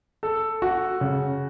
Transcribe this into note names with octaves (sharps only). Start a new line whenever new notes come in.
A4
F#4
C#3